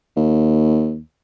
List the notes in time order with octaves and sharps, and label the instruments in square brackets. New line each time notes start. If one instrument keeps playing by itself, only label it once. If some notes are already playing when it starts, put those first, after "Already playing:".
[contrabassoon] D#2